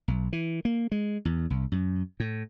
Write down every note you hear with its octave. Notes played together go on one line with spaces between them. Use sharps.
B1
E3
A#3
G#3
E2
C2
F#2
A2